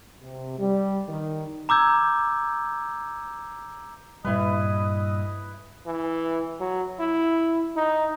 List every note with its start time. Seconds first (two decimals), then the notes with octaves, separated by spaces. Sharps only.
0.22 C3
0.58 G3
1.08 D#3
1.69 A#5 D6 E6 G6 G#6
4.25 G2 A#2 G3 E4 B4 D#5
5.86 E3
6.60 F#3
7.00 E4
7.76 D#4